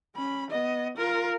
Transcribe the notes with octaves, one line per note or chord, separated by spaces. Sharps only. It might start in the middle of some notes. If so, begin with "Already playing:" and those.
C#4 B5
B3 D#5
F4 A#4